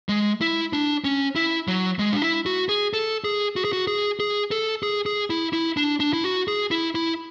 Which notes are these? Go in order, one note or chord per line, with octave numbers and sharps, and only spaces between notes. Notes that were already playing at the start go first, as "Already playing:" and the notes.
G#3
E4
D4
C#4
E4
F#3
G#3
D4
E4
F#4
G#4
A4
G#4
F#4
G#4
F#4
G#4
G#4
A4
G#4
G#4
E4
E4
D4
D4
E4
F#4
G#4
E4
E4